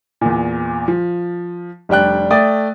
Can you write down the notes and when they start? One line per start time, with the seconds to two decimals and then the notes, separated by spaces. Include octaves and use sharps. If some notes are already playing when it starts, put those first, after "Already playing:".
0.21 E2 A#2
0.88 F3
1.89 F1 G3 D4 G5 F#6
2.30 A3 D5 G5 D#6 A6